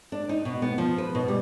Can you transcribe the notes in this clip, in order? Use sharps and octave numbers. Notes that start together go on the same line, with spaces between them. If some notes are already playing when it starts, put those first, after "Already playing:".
D4
D#4
B2
B3
F3
B4
B2
G3